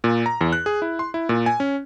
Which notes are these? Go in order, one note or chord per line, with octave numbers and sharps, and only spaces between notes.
A#2
A#5
E2
F#6
G#4
E4
C6
E4
A#2
G#5
C#4